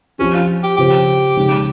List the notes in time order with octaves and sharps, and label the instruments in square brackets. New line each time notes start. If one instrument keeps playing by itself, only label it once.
[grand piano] F3 C4 G4 [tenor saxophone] C#4
[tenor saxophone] F4
G4
[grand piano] C#3 F3 C4 F4 [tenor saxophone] G4
[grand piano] C#3 G#3 D#4